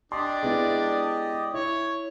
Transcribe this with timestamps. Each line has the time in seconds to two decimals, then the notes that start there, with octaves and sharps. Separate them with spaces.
0.12 D4 G4 D5 D#5 C6
0.43 G#3 B3 E4
1.54 E4 C#5